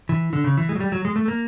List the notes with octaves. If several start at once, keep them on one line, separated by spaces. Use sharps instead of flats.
E3
D3
C#3
E3
G#3
F#3
G3
F#3
G#3
A3
A#3